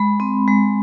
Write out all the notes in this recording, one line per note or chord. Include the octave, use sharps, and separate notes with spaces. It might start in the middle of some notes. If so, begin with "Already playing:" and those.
Already playing: G#3 B5
C4
G#3